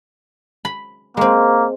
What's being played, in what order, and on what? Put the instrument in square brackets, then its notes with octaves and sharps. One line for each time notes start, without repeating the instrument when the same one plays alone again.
[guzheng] B5
[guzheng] G#3 C4 [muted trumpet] A#3